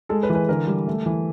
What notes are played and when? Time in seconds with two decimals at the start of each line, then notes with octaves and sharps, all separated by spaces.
0.09 G#3 A4
0.23 B4
0.29 E3
0.35 B4
0.48 D3 A#4
0.67 G3
0.87 A3
1.06 E3